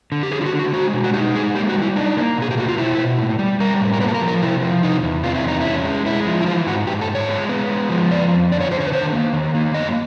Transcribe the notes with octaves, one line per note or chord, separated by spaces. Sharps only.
D3
G4
D3 G#4
F4
F#4
D3
F#4
G#3 F#4
B2
F#4
D#4 G4
G#3 G#4
A#3 G4
F#4
G3
E4
D4 D#4
A#3
B2 G#4
G4
A3 F#4
F4
B2 E4
B2
A2
G3
G3 A#4
A2
A#4
A#3 B4
A4
A#4
F3
A#4
C3 E4
F3
C3 D#4
E2
C3 F4
E4
E2 D#4
C#4 E4
G#3
G#3 E4
F3
E4
E3 F4
G#2 F#4
G#2 G4
A4
G#2
C#5
G#3
B3
G#3
F3
F2 D5
F2
D3 D5
C#5
D3 C5
C#5
B4
D#3 C5
A#3
D#3
A#3
F#2 D#5